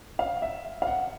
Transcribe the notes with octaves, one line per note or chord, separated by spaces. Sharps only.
F5
E5
F5
F#5